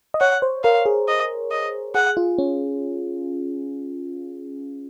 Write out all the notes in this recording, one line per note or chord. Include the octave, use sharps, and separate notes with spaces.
D#5
C#5 F#5
C5
A#4 F5
G#4
D#5
D#5
G#4 F#5
F4
C#4